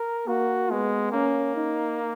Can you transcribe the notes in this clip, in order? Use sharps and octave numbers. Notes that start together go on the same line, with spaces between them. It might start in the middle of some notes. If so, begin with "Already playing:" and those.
Already playing: A#4
A#3 F#4
G#3 B3
A#3 C#4
D#4